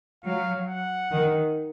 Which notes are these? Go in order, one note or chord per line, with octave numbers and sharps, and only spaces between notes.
F#3 F5
F#5
D#3